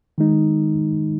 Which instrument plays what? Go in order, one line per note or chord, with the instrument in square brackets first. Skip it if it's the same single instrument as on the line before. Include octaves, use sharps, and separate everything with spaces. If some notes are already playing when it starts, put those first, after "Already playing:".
[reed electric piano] D#3 G#3 D#4